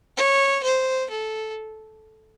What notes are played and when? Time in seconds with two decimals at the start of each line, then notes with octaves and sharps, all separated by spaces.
0.16 C#5
0.63 C5
1.10 A4